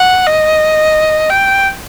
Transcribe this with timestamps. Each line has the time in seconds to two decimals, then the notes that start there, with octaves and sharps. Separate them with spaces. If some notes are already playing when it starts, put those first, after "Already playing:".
Already playing: F#5
0.26 D#5
1.30 G5